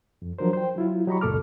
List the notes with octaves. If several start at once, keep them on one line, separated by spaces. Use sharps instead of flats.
F2
F3 F#3 D4 A#4 C5
C5 G5
F#3 E4 F4
F#3 G4 D#5 A#5 B5 C#6
C#2 F#2 A#2 A4 D6 F6